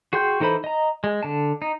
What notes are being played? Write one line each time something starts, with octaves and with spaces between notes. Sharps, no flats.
F#4 G#4 G5 C6 G6
E3 D#4 A4 C5 B5
D#5 A#5
G#3
D3 A5
D#4